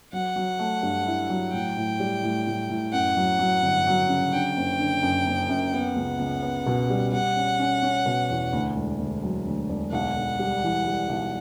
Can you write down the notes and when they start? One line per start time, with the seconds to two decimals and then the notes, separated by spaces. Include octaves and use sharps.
0.13 F#3 F#5
0.36 F#3
0.59 A3
0.83 G2
1.06 E4
1.30 F#3
1.53 A2 G5
1.77 A2
2.00 G3
2.23 A2
2.47 A2
2.69 A2
2.93 F#2 F#5
3.17 F#3
3.39 F#3
3.62 G1
3.87 F#3
4.09 C#3
4.32 D3 G5
4.57 F#1
4.79 D3
5.03 F#2
5.26 F#1
5.49 F#2
5.73 B3 F#5
5.96 C#2
6.19 C#2
6.42 B3
6.66 B2
6.90 G3
7.12 G3 F#5
7.36 C#4
7.59 C#4
7.83 C#4
8.06 B2
8.30 E2
8.52 D2
8.76 E1
8.99 D2
9.23 F#3
9.46 D2
9.69 E1
9.92 B1 F#5
10.16 B1
10.39 G3
10.63 E3
10.86 G3
11.09 B1